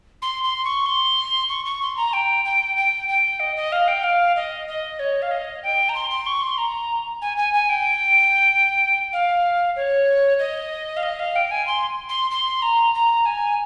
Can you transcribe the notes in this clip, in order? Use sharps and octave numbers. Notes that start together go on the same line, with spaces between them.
C6
C6
C#6
C6
C#6
C#6
C6
A#5
G5
G5
G5
G5
D#5
D#5
F5
G5
F5
D#5
D#5
C#5
F5
D#5
G5
A#5
C6
C6
C#6
C6
A#5
G#5
G#5
G#5
G5
F5
C#5
D#5
F5
D#5
F5
G5
G#5
C6
C6
C6
A#5
A#5
G#5